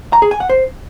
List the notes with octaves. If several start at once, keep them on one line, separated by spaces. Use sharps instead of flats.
A#5
G#4
G#5
F#5
C5